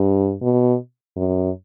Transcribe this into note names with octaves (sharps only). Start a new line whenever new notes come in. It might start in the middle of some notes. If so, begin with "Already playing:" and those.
Already playing: G2
B2
F#2